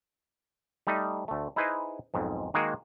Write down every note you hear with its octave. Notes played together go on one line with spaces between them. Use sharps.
G3 A3 D#4
D2 A3
D#4 E4 G#4 B4 C5 D#5
B1 F2 G#2
D#3 G#3 A#3 F#4 G#4 A#4